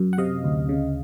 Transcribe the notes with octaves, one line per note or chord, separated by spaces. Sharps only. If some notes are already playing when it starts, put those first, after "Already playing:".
Already playing: F#2
F#5
C3 D#5 F5
D2
C#3